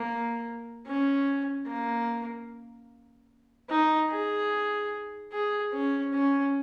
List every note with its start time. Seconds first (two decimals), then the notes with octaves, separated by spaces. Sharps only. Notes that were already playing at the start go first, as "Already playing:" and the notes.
Already playing: A#3
0.86 C#4
1.67 A#3
3.69 D#4
4.11 G#4
5.33 G#4
5.73 C#4
6.13 C#4